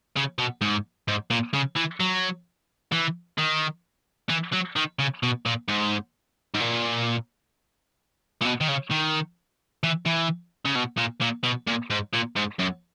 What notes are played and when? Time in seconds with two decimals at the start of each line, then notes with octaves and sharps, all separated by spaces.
0.16 C#3
0.38 B2
0.61 G#2
1.08 G#2
1.31 A#2
1.54 C#3
1.77 E3
2.00 F#3
2.92 E3
3.38 D#3
4.30 E3
4.53 F#3
4.76 D#3
4.99 C#3
5.23 B2
5.46 A#2
5.69 G#2
6.54 G#2
6.60 A#2
8.41 A#2
8.45 B2
8.61 D#3
8.68 C#3
8.91 D#3
9.83 E3
10.06 E3
10.65 C#3
10.76 B2
10.98 A#2
11.21 A#2
11.44 B2
11.67 A#2
11.90 G#2
12.13 A#2
12.36 G#2
12.59 F#2